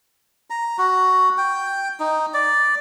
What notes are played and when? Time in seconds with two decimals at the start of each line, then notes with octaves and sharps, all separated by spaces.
0.50 A#5
0.78 F#4
1.38 G5
2.00 D#4
2.34 D5